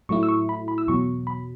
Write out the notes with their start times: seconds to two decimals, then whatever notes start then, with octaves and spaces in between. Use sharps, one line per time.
0.09 A2 F#3 A3 E4 C#6
0.23 E6
0.28 C#6
0.49 B5
0.68 B5
0.78 E6
0.88 E2 B2 F#3 C#6
1.27 B5